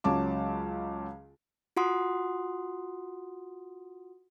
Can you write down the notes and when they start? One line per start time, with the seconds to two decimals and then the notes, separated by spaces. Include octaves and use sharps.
0.04 C#2 F#3 C#4 A5 D6
1.77 F4 F#4 F#5 C6 D#6